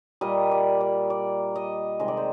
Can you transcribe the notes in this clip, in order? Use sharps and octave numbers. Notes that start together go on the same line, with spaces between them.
A#2 G3 A#3 D#5
D5
D5
D5
D#5
C3 D#3 G#3 D#5
D5
C5